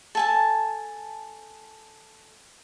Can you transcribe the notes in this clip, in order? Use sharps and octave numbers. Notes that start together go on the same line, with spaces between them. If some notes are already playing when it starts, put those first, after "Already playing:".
A4 G#5 A5